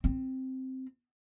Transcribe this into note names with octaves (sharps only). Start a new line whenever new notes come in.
C4